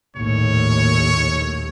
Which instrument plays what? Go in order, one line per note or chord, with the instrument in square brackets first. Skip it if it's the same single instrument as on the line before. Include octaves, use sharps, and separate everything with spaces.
[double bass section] A#1 D#2 A2 [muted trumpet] C#5